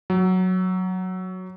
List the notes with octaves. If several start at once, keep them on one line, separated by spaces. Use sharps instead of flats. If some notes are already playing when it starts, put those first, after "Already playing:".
F#3